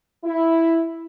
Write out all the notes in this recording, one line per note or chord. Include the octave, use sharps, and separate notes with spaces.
E4